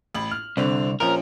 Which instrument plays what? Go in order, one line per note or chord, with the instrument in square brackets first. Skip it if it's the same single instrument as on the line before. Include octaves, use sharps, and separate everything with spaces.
[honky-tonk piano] A1 B5 F#7
F6
[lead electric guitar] C2 [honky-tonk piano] D3 C4 D4
[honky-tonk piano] A#1 F3 C#4 [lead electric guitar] A#4